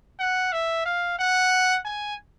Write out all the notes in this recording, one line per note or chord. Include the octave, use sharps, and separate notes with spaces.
F#5
E5
F5
F#5
G#5